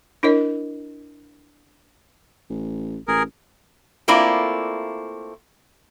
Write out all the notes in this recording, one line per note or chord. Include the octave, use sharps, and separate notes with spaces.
D4 E4 A#4 C#5 D#5
A1
A1 G#4 A#4
A3 A#3 C4 E4 F4 D5